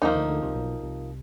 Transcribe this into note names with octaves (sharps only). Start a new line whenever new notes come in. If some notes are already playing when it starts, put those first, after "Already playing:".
D#2 D#3 F3 A#3 D#4
D2 D3
D2 D3
C2 C3
B1 B2
C2 C3